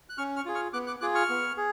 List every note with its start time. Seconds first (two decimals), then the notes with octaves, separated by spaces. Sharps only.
0.09 F#6
0.18 C#4 C#6 F6
0.36 C#6 F6
0.46 F4 G#4
0.54 C#6 F6
0.73 B3 D6 F#6
0.87 D6 F#6
1.01 F4 G#4 D6 F#6
1.14 C#6 F6
1.29 B3
1.57 G#4